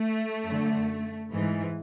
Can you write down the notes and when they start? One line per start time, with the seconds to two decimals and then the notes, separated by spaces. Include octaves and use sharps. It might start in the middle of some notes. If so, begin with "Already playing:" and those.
Already playing: A3
0.44 F#2 D3
1.32 G#2 E3